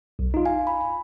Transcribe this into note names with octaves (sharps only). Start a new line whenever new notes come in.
B1
D#4 F4
F5 G#5
B5